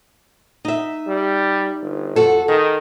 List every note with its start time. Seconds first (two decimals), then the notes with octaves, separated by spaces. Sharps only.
0.65 D#4 E5
1.07 G3
1.81 G1
2.16 F2 F#4 A4
2.48 D#3 G#4